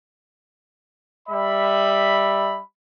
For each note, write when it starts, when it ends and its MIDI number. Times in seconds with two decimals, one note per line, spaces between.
1.29 2.58 55
1.29 2.58 76
1.29 2.58 83